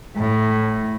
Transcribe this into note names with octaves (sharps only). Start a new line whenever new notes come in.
A2